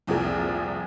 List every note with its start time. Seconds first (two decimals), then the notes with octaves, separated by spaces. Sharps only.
0.07 F1 C2 A#2 F3 C4 G#4